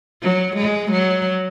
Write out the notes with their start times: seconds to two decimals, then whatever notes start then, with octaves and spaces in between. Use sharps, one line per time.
0.23 F#3
0.57 G#3
0.92 F#3